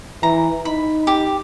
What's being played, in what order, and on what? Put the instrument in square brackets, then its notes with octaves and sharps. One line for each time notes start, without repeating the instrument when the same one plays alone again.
[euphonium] E3 [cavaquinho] A#5
[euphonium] D#4 [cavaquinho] B5
[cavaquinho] G4